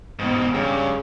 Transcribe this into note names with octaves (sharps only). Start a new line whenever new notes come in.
G#2 B2
G2 C#3